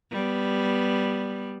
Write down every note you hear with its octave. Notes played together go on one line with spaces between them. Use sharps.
G3 B3